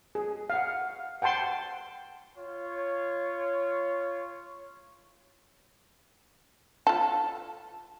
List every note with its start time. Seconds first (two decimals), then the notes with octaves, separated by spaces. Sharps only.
0.15 G#4
0.50 F5 F#5
1.22 F#5 G5 A5 C6
2.37 F4 C#5
6.87 F4 A4